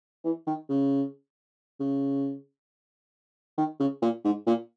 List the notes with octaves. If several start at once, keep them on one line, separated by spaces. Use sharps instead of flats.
E3
D#3
C#3
C#3
D#3
C#3
A#2
G#2
A#2